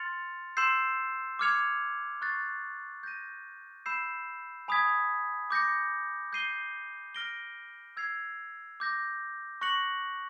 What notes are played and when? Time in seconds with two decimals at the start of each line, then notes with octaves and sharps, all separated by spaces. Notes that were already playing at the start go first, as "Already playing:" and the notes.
Already playing: C6 F6 A6 C#7 F7
0.57 C6 E6 G6 C7 E7
1.39 D6 F6 G#6 C#7 F7
2.22 C#6 F#6 A6 C7
3.03 G6 A#6 D#7
3.86 B5 E6 G6 C7 E7
4.68 G#5 B5 D#6 G#6 B6
5.51 D6 G6 A#6 C#7
6.33 G6 C7 D#7 G7
7.15 F6 A#6 D7 G7
7.97 E6 G#6 C7 F7
8.80 D6 G6 A#6
9.61 C#6 F#6 A#6 C#7 F#7